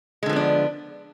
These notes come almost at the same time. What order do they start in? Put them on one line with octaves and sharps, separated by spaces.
G#3 D3 F3 B3 D4